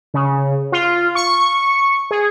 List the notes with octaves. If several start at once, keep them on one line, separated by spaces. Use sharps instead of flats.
C#3
F4
C#6
G#4